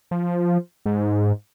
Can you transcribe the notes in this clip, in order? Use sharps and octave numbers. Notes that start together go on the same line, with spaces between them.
F3
G#2